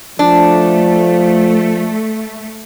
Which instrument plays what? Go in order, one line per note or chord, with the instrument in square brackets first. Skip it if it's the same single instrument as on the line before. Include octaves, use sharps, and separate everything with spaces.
[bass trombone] F3 [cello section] A3 [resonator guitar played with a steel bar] D4